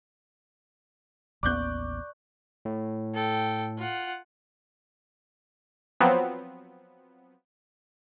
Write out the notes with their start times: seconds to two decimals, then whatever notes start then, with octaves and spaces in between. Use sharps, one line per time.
1.43 A1 D#2 B3 D5 C#6 D6 F#6 G6
2.65 A2
3.15 A4 G5
3.78 F4 F#5
6.00 F3 F#3 B3 C4